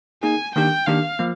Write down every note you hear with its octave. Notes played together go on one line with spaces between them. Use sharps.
A#3 D#4 G#4 G#5
D#3 A#3 D4 G4 G5
D#3 A#3 D4 G4 F5
F3 A#3